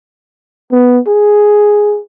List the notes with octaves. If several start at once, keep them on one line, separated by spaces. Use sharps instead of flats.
B3
G#4